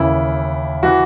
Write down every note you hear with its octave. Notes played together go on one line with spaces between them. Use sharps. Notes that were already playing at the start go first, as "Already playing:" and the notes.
Already playing: D#2 C#3 E3 E4
E3 F#4